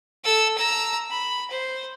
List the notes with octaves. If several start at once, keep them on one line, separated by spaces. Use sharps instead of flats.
A4 E6
A#5 E6
B5
C5